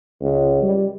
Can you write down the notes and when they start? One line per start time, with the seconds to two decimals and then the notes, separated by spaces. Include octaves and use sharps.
0.21 C#2
0.63 G3